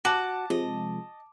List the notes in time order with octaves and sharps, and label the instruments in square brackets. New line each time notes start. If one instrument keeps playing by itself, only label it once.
[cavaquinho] F#4 [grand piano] A5 D6
[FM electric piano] C3 F3 G#3 [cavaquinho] D#5